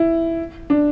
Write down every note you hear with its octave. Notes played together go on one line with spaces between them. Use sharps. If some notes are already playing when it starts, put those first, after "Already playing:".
Already playing: E4
D4